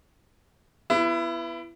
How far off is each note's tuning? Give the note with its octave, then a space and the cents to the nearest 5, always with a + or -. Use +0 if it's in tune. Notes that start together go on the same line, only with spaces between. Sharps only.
B3 +0 E4 +30